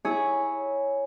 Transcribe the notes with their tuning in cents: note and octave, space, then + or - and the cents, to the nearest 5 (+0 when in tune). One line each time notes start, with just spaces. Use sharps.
E4 -20 G#4 +0 C#5 +0